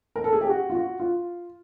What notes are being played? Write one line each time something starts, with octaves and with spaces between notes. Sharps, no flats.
A#4
A4
G#4
G4
F#4
F4
F#4
F4